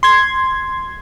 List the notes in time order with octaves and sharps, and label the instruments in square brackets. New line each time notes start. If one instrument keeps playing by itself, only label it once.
[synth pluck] C6 G#6